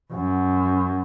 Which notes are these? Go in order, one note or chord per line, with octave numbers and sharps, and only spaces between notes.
F#2